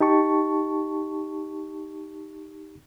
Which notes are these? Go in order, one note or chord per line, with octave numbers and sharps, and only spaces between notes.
D#4 G4 A5 C#6